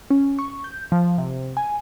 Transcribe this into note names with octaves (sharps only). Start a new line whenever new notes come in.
C#4
C#6
G6
F3
C3
G#5